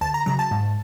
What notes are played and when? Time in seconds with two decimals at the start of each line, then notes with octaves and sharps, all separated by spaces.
0.01 D2 A5
0.14 A#5
0.26 C#3 F#3 A#5
0.39 A5
0.51 G#2